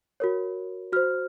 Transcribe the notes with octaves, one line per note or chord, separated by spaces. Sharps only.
F#4 A#4 C#5
F#4 C5 F6